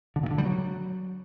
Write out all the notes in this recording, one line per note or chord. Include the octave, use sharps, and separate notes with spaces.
D3
A#2
D3
G3
F#3